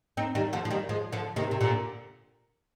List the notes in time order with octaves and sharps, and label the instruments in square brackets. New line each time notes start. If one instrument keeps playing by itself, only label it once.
[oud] C4 D#4
D#3 G3
D3 F3
F3
D#3 G3
F3 G#3
D3 F3
C3 D#3
C3
A#2 D3